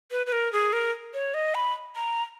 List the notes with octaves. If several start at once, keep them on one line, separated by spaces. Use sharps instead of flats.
B4
B4
A#4
G#4
A#4
C#5
D#5
B5
A#5